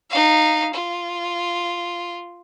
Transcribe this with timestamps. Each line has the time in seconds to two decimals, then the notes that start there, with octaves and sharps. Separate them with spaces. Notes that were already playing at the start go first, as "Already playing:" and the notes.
0.11 D#4 F5
0.74 F4